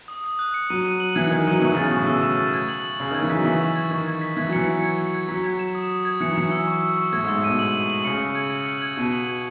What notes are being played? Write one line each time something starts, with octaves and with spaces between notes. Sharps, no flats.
D#6
D#6
F#6
C#7
F#3 D#7
D#7
F#7
E3 G#6
D#3 G#6
F#3 D#7
E3 C#6
C#3
A6
B2
A2 C#6
B2 E6
E7
A6
G#6
F#7
F#7
C#3 F#7
D#3
G#6
E3
F#3 B6
E3 C#6
C#6
G#6
D#3 C#6
G#6
B6
E3 G#6
F#3
E3 C#7
C#7
G#6
C#7
G#6
F#3 B6
G#6
E7
D#6
D#6
G#6
E3 C#7
F#3
E3 C#7
E6
C#6
E6
C#6
A2 G#6
G#2
E6
A2
B2 D#7
F#7
D#7
F#7
C#3 C#7
C#7
G#6
C#7
F#7
G#6
B2 D#7
F#7
G#6